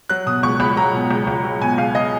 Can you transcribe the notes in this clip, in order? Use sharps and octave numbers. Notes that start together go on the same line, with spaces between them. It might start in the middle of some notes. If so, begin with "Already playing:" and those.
F#3 F#6
B2 D#6
C#2 C#6
C#2 B5
F#3 A#5
B2
C#2
C#2
F#3
B2 G#5
C#2 F5
D#5